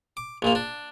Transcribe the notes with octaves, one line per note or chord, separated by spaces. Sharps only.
D6
A#1 A#2 A#3
D4